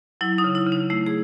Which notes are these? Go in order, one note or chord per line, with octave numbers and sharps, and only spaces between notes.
F#3 E4
D#4
C#3
E4
C#3
D#4
A3 E4
G#4